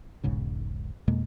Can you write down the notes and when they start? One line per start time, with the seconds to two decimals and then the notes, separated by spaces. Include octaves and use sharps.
0.24 E1 B1 G#2 C#3
1.08 F2 B2 G#3 A#3